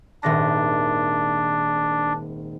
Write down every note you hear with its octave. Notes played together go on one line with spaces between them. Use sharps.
D#1 G#1 D4 A#6